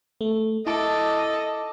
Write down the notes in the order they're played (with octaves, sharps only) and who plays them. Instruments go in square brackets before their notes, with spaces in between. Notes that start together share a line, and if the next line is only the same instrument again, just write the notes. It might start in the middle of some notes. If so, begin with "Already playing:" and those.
[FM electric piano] A3
[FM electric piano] E4 A5 D6 [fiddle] A4 [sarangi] D#5